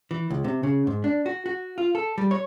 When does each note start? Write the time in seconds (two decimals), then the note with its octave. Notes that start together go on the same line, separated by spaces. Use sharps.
0.11 E3
0.30 C#2
0.44 C3
0.63 C#3
0.87 G#2
1.04 D4
1.26 F#4
1.46 F#4
1.78 F4
1.95 A4
2.18 G3
2.31 C#5